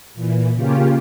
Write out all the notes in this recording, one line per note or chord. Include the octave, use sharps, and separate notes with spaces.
A#2 E3
C#3 A#3 C#4 F4 G4